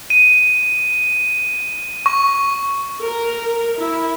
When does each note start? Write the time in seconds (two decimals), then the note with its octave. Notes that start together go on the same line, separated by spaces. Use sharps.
0.10 D#7
2.06 C#6
3.01 A#4
3.78 E4